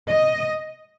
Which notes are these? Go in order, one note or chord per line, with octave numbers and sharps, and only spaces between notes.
D#5